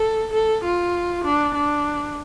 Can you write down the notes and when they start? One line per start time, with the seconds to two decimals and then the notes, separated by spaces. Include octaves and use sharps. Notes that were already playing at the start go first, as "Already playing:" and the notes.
Already playing: A4
0.33 A4
0.64 F4
1.25 D4
1.54 D4